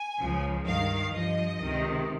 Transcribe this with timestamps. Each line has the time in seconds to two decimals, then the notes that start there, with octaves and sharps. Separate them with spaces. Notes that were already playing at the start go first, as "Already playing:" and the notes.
Already playing: G#5
0.20 C#2 C#3 F3
0.66 G2 D#3 F5
1.13 G2 F3 D#5
1.60 C#2 C3 D#3